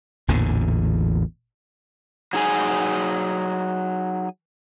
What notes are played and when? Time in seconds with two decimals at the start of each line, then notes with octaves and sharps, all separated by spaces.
0.28 A1 E2 A#2 D3
2.33 F#3 D#4 G#4 G#5